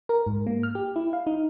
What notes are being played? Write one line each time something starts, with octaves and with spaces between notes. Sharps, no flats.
A#4
G#2
A#3
F6
G4
E4
F5
D#4